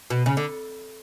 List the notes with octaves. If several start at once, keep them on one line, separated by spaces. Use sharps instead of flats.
B2
C#3
D3